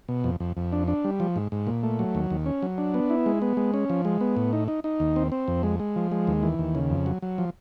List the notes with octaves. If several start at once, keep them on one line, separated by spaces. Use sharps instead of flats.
B2
F2
F2
F2
D4
D4
G3
F3
G#2
G#2
A#2
A3
F#3
D#2
D#2
C#4
F#3
D4
B3
E4
G#3
B3
G#3
C#4
F3
G#3
B3
A2
D#4
D#4
D#4
D#2
C4
C4
F2
G#3
G#3
F3
G#3
D#2
E3
D#2
C#3
F2
F#3
F#3
F3